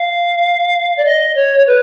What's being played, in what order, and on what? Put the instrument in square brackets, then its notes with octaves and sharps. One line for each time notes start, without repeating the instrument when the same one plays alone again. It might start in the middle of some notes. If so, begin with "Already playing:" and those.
Already playing: [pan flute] F5
D5
D#5
C#5
B4